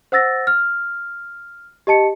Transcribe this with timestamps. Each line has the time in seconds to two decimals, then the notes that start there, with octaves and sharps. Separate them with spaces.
0.12 C5 F#5 E6 A6 A#6
0.47 F6
1.87 G4 D#5 A5 C#7